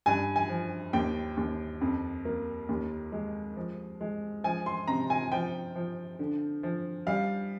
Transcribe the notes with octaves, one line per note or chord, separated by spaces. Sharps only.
G2 G#5
G#5
F3
D#2 G5
D#2
F2
A#3
D#2
G#3
F3
G#3
F3 G#5
C6
C3 A#5
G#5
F3 G5
F3
D3
F3
G3 F5